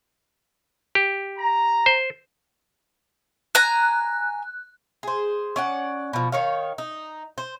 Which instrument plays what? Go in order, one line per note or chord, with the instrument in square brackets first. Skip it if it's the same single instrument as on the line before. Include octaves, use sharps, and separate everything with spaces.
[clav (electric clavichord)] G4
[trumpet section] A#5
[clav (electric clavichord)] C5
[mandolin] G#5 A#5 [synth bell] F#6
[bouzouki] G#4 C5
C#4 D5 F#5
B2 F3
D#3 C#5 F5
D#4
C5